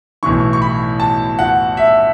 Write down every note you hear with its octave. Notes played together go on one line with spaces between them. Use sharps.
B1 A2 E3 C#6
C#6
B5
A5
F#5
E5